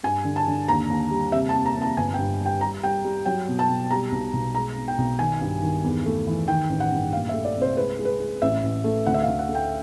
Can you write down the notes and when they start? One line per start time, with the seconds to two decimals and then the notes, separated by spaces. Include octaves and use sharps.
0.03 G2 G#5
0.25 D3
0.36 A5
0.47 D3
0.68 D#2 A#5
0.90 D#2
1.11 G3
1.32 C3 E5
1.49 A5
1.54 F2
1.66 A#5
1.75 F2
1.82 A5
1.97 G1 G#5
2.14 G5
2.18 G2
2.41 G3 G5
2.61 G3 A#5
2.83 G3 G5
3.05 G3
3.25 F#3 G5
3.48 B2
3.59 A5
3.69 B2
3.91 G3 A#5
4.12 B1
4.33 B1
4.55 G#3 A#5
4.77 B2
4.88 G5
4.98 B1
5.19 D#3 G#5
5.41 G2
5.63 D#3
5.84 E2
6.06 A3
6.27 E3
6.48 D#3 G5
6.69 A1
6.80 F#5
6.91 G2
7.13 A#2 F5
7.29 E5
7.34 A3
7.45 D5
7.56 C2
7.62 C5
7.77 G#3 B4
7.99 G#3
8.05 B4
8.20 G#3
8.42 A1 E5
8.63 A1
8.84 A3
9.06 D2 F#5
9.14 E5
9.22 F5
9.27 D2
9.39 F#5
9.49 A3
9.55 G5